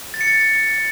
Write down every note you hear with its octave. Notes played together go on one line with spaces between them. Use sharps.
A6
C#7
A6